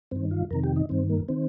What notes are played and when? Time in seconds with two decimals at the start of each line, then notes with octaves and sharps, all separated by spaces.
0.11 G2 D#3 C4
0.31 F4
0.51 F2 C3 D#3 A#4
0.64 G4
0.76 D#4
0.89 G2 D#3 C4
1.09 A#3
1.29 D#3 C4